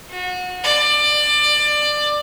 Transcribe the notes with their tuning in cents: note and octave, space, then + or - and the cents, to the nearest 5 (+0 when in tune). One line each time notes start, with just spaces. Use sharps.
F#4 -30
D5 +20